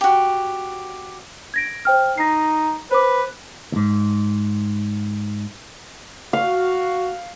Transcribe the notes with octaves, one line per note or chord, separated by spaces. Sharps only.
F#4 G4
G#6 A#6 D7
C5 G5 F6
D#4 A#6 C7
B4 C5 D6
D#2 G#2
F#4 F5